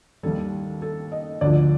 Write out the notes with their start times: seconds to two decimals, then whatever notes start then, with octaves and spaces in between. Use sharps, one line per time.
0.23 D#2 D#3 G3 A4
0.82 A4
1.12 D#5
1.41 D2 D3 F3 D5